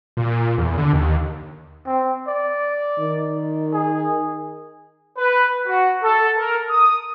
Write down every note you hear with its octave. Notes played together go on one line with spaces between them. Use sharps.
A#2
E2
D3
D#2
C4
D5
D#3
G#4
B4
F#4
A4
A#4
D#6